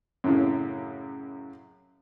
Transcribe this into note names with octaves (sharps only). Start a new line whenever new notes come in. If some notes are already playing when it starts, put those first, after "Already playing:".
F#2 A2 C#3